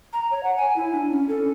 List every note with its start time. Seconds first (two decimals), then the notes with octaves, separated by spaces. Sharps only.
0.13 A#5
0.31 C#5
0.43 F#5
0.57 G#5
0.76 E4
0.94 D4
1.11 C#4
1.29 A4